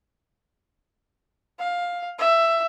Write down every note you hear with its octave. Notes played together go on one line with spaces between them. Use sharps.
F5
E5